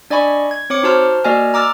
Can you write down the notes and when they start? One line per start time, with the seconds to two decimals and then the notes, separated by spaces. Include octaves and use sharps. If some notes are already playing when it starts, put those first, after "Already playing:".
0.10 D4 D5 D#5 G#5 B5 C#6
0.51 G#6
0.70 C4 C#5 D6 C#7
0.83 D#4 F#4 C5 A5 C6 F6
1.24 A#3 F#4 D5 D#5 G#5 F6
1.54 A#5 D6 E6 F6 A6